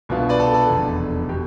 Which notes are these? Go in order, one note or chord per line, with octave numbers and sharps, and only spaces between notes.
C2 B2 B3 D4 F4
B4 D5
A4
A4
F1 E2 D3
B2 G4